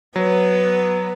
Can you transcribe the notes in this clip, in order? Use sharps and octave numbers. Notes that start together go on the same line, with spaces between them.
F#3 B3 B4